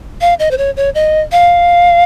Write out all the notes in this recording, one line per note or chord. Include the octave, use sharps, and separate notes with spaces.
F5
D#5
C5
C#5
C#5
D#5
F5